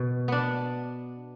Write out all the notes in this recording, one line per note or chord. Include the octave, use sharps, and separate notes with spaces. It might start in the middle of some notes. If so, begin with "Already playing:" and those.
Already playing: B2
B3 D4